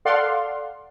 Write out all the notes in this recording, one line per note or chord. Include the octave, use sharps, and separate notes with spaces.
A4 D5 F5 F#5 C6